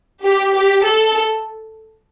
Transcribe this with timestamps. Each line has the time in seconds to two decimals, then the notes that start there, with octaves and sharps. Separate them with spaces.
0.24 G4
0.54 G4
0.85 A4